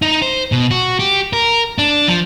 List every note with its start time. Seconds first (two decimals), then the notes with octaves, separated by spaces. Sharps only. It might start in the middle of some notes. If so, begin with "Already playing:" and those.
0.02 D#4
0.22 C5
0.52 B2
0.71 F#4
0.99 G4
1.33 A#4
1.78 D4
2.08 F3